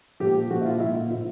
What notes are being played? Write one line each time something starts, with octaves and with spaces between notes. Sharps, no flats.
A#2 F3 G4
A#2 F3 F#4
E4
F4
A#2 F3 E4
F4
A#2 F3 F4